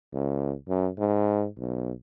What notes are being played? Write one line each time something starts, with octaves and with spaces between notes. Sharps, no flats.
C#2
F#2
G#2
B1